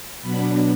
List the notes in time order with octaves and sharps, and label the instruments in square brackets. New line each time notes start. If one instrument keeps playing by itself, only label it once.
[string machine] B2 F#3 B3 D4 B5